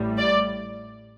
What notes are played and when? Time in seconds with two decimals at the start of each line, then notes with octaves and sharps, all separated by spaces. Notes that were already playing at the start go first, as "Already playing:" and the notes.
Already playing: A1 A2 G3
0.18 D5